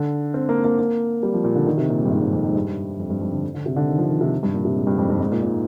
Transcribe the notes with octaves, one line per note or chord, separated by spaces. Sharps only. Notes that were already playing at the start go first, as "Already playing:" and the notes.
Already playing: D3
C4
A#3
A#3
A#3
G3
F3
A#2
D3
D#3
C3
A#2
G#2
G2
G#2
G2
F2
G#2
G2
F2
G2
F2
D3
D3
C3
D3
D#3
F3
D3
D#3
C3
G2
A#2
C3
G#2
G2
F2
G2
G#2
A#2
A#2